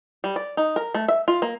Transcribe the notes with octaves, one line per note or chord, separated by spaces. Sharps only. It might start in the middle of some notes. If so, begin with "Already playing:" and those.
G3
D5
D#4
A#4
A3
E5
F4
A#3